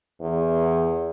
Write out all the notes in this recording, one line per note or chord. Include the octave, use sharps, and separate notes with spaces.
E2